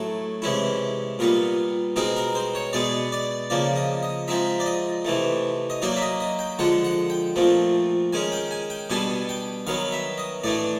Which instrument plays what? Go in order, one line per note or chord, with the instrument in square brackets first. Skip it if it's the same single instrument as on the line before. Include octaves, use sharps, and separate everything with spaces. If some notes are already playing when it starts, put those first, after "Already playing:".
Already playing: [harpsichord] A2 F#3 A3 A4
C3 E3 G#3 C#4 E4
A#2 G3 B3 A#4
B2 G#3 C4 D#4 A#4
A#4
C5
C#5
B2 G#3 B3 D5
D5
C#3 F3 A#3 D5
D#5
D#5
F3 G#3 C4 D#4 E5
D5
D#5
C3 E3 A3
D#5
F#3 A#3 D#4 D5
E5
D#5
D#5
G5
D3 F3 G#3 F#5
F#5
G5
A#2 F3 A3 C4
D#3 G#3 C#4 G#5
G5
G#5
G5
B2 G3 B3 D4 G#5
G5
D#3 F#3 B3 F5
E5
D#5
A2 E3 A3 D4 D5